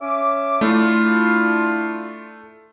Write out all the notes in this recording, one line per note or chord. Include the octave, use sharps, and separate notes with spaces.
C#4 E5 D6
A3 D4 E4 F4